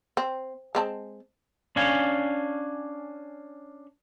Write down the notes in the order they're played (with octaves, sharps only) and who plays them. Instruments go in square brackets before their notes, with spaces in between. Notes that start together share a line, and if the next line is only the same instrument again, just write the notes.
[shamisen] C4
G#3 C4 A5
[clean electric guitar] C#4 D4 F5 G#5